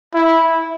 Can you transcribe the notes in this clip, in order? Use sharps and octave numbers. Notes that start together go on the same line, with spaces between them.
E4